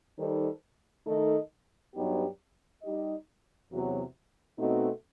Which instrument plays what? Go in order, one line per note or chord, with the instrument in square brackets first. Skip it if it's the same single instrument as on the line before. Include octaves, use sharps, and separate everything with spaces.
[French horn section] D#3 G3 D#4 A4 C5
D#3 A3 D#4 A4 D#5
G2 F#3 B3 D#4 G4
G3 D#4 G4 D#5
E2 C3 F#3 B3
B2 A3 C4 D#4 F#4